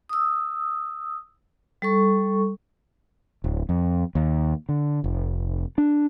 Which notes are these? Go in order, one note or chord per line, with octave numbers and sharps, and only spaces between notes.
D#6 E6
G3 A4 C#6
D1
F2
D#2
D3
F1
D4